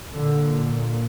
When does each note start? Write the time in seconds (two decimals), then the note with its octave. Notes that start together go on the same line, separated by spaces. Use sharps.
0.14 A#2 D3